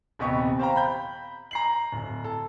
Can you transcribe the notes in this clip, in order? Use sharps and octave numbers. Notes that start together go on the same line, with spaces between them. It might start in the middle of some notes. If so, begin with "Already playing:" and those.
D#1 C3 B3 G4 D#5 C#6
C5 F5 G5 A#5
B5 G6
A#5 C7 F#7
D1
A4